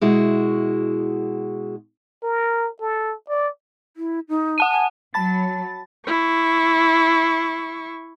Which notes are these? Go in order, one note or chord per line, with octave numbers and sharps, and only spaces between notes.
B2 G#3 E4 F#4
A#4
A4
D5
E4
D#4
F#5 A5 D#7
G#5
F#3 A5 B5 A6
E4 C#6